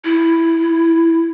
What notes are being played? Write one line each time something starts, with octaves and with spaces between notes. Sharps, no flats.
E4